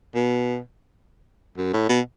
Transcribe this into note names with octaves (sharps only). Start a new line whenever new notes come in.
B2
F#2
A2
B2